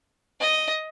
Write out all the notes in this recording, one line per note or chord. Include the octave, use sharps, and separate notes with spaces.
D#5